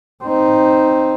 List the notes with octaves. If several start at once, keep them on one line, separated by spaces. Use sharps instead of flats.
C4 D#4